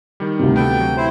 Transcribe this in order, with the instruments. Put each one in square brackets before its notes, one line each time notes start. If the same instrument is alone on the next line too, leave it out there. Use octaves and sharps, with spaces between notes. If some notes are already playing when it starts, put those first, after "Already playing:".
[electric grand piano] D#3 G3
[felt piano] D2 C3
[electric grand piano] B3 D4 A4 [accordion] G5
[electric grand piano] F#3
[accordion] E4 C5